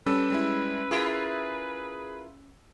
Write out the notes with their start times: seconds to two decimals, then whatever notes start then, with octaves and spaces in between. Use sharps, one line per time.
0.06 G3 C#4 A4 B4 E6
0.30 G3 G#3 E4
0.91 E4 F4 G#4 A#4